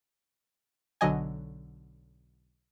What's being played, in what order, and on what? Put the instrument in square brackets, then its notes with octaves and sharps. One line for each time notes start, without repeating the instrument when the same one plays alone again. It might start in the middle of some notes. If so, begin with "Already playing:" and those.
[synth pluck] B1 D3 F#3 D#5 G#5